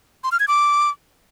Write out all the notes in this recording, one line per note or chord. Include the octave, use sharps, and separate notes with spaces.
C6
F6
G#6
D6